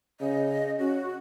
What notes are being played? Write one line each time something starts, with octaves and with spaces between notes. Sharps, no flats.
C#3 D#5
C#4 F#4